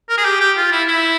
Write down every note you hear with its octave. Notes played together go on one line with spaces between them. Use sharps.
A#4
G#4
G4
G4
F4
E4
E4